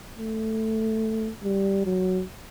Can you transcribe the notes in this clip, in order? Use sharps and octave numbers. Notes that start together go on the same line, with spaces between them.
A3
G3
F#3